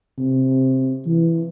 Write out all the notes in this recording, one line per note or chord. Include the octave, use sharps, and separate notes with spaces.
C3
E3